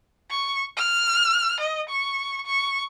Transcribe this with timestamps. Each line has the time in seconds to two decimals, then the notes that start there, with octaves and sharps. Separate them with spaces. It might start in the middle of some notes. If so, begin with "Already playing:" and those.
0.30 C#6
0.77 F6
1.60 D#5
1.89 C#6
2.46 C#6